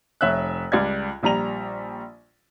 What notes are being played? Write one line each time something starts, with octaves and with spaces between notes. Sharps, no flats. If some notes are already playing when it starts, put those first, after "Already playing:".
F1 C#5 E5 E6 F#6
C#2 G3 D5 G#6
A#1 G3 A#5 F7